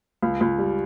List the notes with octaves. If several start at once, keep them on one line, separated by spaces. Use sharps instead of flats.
C#2
C#2
G3